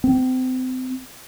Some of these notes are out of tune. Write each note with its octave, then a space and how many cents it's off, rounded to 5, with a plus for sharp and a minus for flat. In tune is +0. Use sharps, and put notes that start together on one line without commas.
C4 -30